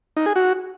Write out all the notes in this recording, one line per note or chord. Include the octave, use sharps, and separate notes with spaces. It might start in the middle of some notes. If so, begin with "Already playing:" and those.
D#4
G#4
F#4